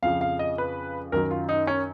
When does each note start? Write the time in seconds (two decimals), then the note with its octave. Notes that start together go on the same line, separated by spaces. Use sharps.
0.02 F2 C#3 F3 F5
0.21 F5
0.39 D#5
0.58 B4
1.12 F#2 D#3 F#3 A#4
1.31 F4
1.49 D#4
1.67 C#4